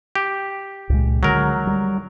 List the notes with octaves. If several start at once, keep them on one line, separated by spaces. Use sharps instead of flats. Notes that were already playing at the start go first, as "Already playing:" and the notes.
G4
C#2 A#2 G#3
D3 D#3 F#3 G#3 A#4
G3